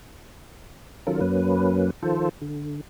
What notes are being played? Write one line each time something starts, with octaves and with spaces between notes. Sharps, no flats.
D#3 F#3 C#4 F4 A4 A#4
F#2 F#3 A#3 C#4 B4
D#3 F3 F4 A4 C5
D3